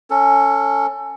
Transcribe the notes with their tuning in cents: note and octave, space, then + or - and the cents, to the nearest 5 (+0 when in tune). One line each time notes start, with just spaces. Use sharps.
C#4 +0 A4 +20